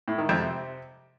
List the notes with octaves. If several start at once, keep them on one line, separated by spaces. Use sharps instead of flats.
A2
D#3
F2
C3